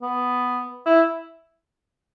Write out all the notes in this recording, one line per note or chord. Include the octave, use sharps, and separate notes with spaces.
B3
E4